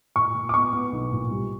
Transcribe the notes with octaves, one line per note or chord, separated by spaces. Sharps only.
A#2 C#6
A#2
D6
B3 C#6
B3
B1
A#2
G3